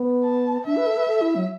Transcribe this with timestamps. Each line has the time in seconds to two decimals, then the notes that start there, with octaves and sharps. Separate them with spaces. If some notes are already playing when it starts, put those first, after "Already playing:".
Already playing: B3
0.24 A5
0.66 D4 E5
0.77 B4
0.87 A4
0.97 B4
1.08 A4
1.21 E4
1.35 F#3